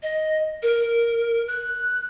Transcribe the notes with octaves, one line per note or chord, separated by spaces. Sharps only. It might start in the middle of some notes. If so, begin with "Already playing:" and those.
D#5
A#4
F#6